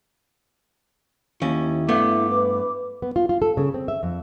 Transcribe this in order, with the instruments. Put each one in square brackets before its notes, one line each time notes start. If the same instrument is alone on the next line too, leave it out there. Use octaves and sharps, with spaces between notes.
[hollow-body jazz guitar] D#2 C#4 [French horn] E4
[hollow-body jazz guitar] G2 A3 B3 [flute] D6
[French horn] B4
[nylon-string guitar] B3
F4
F4
A4
C#3
C4
E5
F2